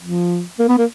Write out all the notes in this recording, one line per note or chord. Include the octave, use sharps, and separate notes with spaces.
F3
A#3
B3
A#3